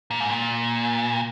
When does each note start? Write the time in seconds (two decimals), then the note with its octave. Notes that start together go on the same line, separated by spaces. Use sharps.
0.11 A#2
0.20 G#2
0.30 A#2